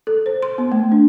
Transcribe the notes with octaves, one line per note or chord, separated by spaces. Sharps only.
A4
C5
C6
B3
A3
D4